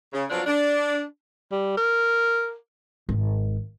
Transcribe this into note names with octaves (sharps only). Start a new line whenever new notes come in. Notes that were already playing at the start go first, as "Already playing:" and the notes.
C#3
F3 F#3 B3 C4 D4 F4
D4
G3
A#4
G#1